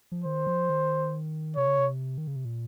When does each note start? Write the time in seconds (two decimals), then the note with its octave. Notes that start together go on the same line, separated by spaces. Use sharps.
0.12 F3
0.24 D#3 C5
0.47 F3
0.70 D#3
1.56 C3 C#5
1.67 C#3
1.78 C3
2.18 D#3
2.27 C#3
2.36 C3
2.45 A#2